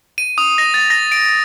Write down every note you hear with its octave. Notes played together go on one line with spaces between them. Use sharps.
D#7
D#6
A#6
A6
A#6
D7